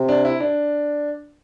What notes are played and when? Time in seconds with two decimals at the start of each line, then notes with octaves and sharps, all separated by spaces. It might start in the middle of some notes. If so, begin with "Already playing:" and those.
Already playing: C3
0.08 D4
0.25 E4
0.40 D4